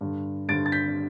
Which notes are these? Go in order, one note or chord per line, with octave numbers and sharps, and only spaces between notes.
G2 D3
G2 D3 A6 D7
A6
G6 B6